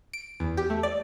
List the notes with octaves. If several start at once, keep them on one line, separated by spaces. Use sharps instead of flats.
D7
E2
G4
A3
D5